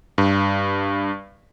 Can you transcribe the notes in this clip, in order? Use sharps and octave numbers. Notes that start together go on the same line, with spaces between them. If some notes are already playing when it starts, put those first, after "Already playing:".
G2